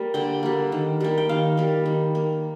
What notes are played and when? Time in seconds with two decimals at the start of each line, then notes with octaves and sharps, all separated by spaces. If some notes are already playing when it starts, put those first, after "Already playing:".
Already playing: G3 A#3
0.14 D3 G5
0.43 G3 A#3
0.72 D#3
1.00 G3 A#3
1.18 G5
1.29 D#3 F5
1.57 G3 A#3
1.85 D#3
2.15 A#3